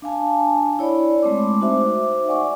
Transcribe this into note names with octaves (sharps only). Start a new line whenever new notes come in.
D4 F5 G#5 A5
E4 C#5 D5 B5
G#3 A3 C4 D6
D#4 F#4 C5 E5 D6
D5 F#5 G#5 C#6 D6